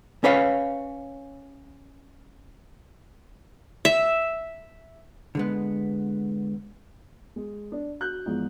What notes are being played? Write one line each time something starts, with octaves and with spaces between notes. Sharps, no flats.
C#4 B4 C#5 F5
E5
D3 G#3 B3
G#3
D4
F#4 F#6 G6
E2 G#2 F3